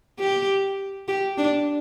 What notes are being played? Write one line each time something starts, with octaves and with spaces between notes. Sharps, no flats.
G4
G4
D4